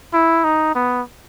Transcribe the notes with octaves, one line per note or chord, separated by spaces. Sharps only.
E4
D#4
B3